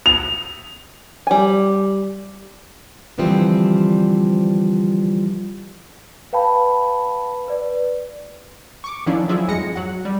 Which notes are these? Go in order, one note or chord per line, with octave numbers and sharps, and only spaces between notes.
F7
G3 G#5
D3 E3 F3 G3 C4
B4 F5 G5 A5 B5
B4 D5
C#6 D6
D#3 F3 C#4 D4 E4
F3 F#3 E4 F4 G#4
F2 G#2 G#3 A#6 C#7
F#3 F#5
G3